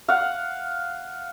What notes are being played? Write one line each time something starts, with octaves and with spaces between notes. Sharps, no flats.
F5 F#5